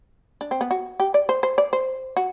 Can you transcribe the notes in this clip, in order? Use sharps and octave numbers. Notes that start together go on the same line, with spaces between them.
D4
C4
B3
F#4
G4
D5
C5
C5
D5
C5
F#4